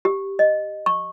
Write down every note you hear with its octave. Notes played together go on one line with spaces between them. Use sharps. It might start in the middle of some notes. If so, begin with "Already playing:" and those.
G4
D#5
C#6